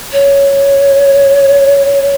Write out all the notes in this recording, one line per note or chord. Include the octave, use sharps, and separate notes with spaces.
C#5